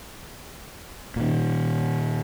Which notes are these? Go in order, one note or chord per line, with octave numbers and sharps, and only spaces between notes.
A#2 D#3